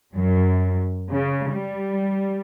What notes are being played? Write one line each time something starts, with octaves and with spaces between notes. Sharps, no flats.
F#2
C#3
G3